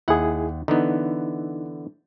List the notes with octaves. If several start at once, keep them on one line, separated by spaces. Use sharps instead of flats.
D#2 E4 G#4 F#5
D3 E3 B3 D#4